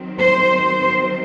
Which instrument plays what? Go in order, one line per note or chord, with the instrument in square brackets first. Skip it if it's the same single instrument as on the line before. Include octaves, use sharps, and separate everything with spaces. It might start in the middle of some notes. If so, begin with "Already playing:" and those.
Already playing: [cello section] D#3 F#3 C4
C5
C5